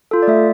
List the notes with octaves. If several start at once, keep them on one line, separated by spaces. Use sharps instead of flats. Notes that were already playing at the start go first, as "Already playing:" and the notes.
F4 A4
D5
A3 E5